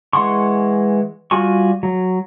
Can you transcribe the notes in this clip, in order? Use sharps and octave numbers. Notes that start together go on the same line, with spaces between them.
E3 G#3 F#5 C6 C#6
G3 F4 F#4 G#5 C#6
F#3